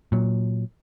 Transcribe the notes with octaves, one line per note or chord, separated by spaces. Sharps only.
A#2 F#3